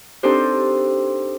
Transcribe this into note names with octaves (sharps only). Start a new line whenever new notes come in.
C4 D4 D#4 G4 A4 C5